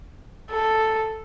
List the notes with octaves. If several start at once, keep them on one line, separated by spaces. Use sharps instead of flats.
A4